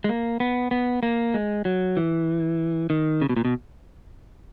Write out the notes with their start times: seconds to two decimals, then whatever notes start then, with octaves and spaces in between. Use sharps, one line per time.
0.04 G#3
0.09 A#3
0.40 B3
0.71 B3
1.03 A#3
1.34 G#3
1.65 F#3
1.97 E3
2.90 D#3
3.22 C#3
3.29 B2
3.36 A#2
3.45 B2